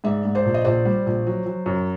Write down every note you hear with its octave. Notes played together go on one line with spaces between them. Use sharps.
G#2 D5 E5
G#2
C5 D5
A#1
D#5
A#1 C5 D5
G3
A#1
F#3
F#3
F#2